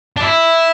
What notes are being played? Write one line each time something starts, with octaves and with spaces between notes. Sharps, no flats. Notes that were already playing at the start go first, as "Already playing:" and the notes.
D4
E4